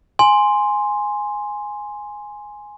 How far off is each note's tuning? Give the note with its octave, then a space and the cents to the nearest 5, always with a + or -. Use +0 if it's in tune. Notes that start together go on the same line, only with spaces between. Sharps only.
G#5 +0 C6 +0